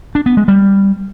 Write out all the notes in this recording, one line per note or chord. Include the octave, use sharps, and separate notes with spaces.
D4
B3
G#3
G3